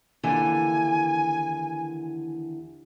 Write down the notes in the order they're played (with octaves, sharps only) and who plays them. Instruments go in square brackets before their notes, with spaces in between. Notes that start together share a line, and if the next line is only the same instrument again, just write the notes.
[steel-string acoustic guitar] D#2 D3 E3 [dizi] G#5